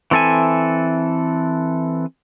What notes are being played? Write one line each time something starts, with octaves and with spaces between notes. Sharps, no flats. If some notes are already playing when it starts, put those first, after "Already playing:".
E3 C4 A4 E5 G#5